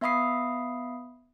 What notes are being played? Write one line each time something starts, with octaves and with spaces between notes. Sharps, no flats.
B3 E5 F5 B5 D#6 C7